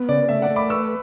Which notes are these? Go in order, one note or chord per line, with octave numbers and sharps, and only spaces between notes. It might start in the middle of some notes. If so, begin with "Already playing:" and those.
Already playing: B3
C#3 D5
A3 E5
D5 F#5
A3
B5 D6
B4 C#6 E6